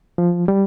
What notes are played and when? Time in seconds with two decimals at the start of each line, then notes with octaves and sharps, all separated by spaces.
0.18 F3
0.48 G3